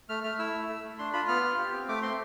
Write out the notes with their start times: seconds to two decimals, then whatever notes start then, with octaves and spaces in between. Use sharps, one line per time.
0.09 A3 F6
0.23 A3 F6
0.39 E4 E6
0.54 A3
0.69 A3
0.84 A3
0.99 D4 C6
1.13 F4 B5
1.28 B3 F6
1.43 F4
1.58 G4
1.73 C4
1.88 A3 D6
2.02 C4 C6